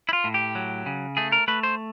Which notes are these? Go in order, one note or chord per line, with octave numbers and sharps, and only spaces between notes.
E4
F4
A2
G4
F#3
C#3
A3 G#4
A#4
A3 B4
C5